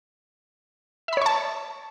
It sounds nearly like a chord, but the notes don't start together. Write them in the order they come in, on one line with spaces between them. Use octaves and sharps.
E5 B5 C#5 C#6 A5